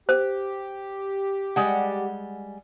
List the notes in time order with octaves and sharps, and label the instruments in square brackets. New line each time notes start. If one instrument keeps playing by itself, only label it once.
[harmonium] G4 [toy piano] C5
[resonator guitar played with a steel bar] G3 G#3 F#5